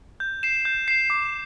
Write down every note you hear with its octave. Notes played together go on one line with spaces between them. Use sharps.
G6
C7 E7
G6
C7 E7
D6